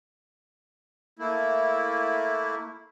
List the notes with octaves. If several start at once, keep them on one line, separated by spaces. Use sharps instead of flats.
A3 A#3 E4